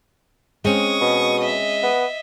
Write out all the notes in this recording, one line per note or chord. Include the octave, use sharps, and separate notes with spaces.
G#3 C4 C#4 C#6 D#6
B2
D#5 E5
B3